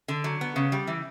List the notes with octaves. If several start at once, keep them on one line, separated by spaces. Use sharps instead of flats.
D3
F#3
B3
C#3
G3
E3